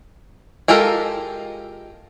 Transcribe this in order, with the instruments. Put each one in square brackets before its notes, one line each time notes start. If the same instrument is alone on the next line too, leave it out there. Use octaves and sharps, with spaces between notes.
[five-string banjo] G#3 F4 G4 A4 A#4